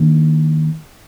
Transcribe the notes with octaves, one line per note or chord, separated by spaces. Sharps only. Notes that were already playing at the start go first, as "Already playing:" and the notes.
Already playing: D#3 A#3 D4